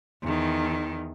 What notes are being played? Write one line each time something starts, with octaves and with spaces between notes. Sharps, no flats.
E2 D#3